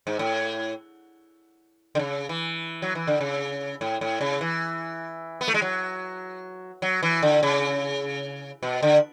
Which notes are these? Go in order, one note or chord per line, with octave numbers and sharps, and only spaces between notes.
G#2
A2
D3
C#3
E3
F#3
E3
D3
C#3
A2
A2
C#3
E3
B3
A3
G#3
F#3
F#3
E3
D3
C#3
B2
D3